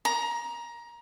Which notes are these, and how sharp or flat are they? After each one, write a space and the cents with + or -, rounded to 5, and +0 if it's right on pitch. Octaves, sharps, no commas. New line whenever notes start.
A#5 +20